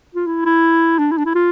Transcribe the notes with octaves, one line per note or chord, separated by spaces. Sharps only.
F4
E4
E4
D4
E4
D4
E4
F4